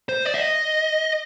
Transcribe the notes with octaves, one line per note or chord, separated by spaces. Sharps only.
C5
D5
E5
D#5